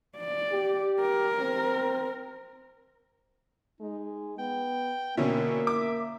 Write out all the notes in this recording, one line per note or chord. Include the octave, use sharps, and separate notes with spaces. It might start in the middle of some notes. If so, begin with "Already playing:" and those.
D5
G4
A#4
C4
G#3 D#4
B3 G5
B2 D3 A#3 C#4 E5
D6